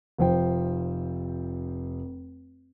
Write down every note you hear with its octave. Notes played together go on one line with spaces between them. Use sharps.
F1 F3 C5 G5